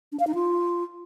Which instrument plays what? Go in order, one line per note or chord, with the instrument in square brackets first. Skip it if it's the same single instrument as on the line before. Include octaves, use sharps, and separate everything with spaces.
[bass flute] D4
F5
D#4
F4